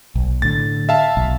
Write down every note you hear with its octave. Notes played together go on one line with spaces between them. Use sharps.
B1
A2 D3 A6
E5 F5 A5
B1